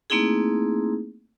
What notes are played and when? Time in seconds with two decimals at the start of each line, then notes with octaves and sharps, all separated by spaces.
0.10 A3 A#3 C4 D#4 E4 G#4